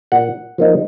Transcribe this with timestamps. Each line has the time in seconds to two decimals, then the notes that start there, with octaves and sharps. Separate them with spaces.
0.12 A#2 F#5
0.58 F3 A#3 D#4